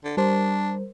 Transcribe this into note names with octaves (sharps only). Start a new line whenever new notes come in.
D3
G3 D4 A#4 C5